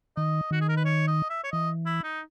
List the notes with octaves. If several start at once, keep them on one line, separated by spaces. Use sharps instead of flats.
D#3 D#5
D#3 F#4
G#4
A#4
B4
C#5
D#5
E5
C#5
E3 D#5
E4
D#4